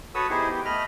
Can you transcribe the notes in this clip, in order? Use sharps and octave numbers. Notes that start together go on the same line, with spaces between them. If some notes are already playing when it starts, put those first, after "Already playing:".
F#4 A4 B4 C#5 D#6 E6
B3 D#4 E4 G4 G#4 C5
B3 G4
A3 D#5 B5 F6